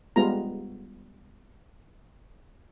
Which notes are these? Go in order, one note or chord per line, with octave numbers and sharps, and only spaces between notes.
G3 G#3 B3 F4 A#5